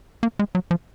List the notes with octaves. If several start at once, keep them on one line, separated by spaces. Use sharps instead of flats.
A#3
G#3
F#3
F3